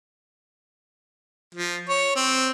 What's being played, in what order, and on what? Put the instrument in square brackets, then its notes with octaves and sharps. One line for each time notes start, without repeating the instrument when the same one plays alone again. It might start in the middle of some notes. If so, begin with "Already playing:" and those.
[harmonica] F3
C#5
C4